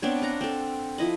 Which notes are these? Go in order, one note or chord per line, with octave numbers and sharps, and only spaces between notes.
B3 C4 D4 C#5
F5 F#5 A#5
C4 A4
F3 E4 D#5 B5